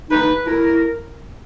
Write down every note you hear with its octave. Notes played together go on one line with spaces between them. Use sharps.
D#4 B4
E4 A#4